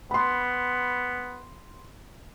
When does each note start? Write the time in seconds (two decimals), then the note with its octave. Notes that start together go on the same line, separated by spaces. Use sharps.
0.11 B3 B5 C6